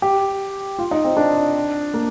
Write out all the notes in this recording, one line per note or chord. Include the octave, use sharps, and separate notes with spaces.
G4
F4
D#4
C4
D4
A#3